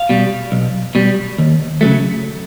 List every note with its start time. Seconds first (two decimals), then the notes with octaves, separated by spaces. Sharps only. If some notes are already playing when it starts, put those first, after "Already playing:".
Already playing: F5
0.09 B2 G3
0.52 B1
0.95 B2 G3
1.38 D#2
1.81 C#3 F#3 A3